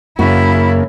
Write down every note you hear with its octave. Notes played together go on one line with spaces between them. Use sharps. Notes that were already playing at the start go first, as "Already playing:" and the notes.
F#2 C#3 A#3 E4 F#4